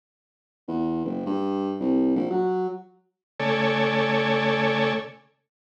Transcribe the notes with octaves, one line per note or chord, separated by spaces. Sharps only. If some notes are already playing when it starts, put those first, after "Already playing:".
E2
F#1
G2
C2
A#1
F#3
C#3 A3 A4 C#5 D5 G#5